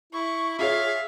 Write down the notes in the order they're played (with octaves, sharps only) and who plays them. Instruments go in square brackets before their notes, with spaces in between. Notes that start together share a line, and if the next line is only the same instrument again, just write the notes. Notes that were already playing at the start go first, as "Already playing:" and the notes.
[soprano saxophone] E4 [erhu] C#6
[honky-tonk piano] F4 G#4 C#5 [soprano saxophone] E5 [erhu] F5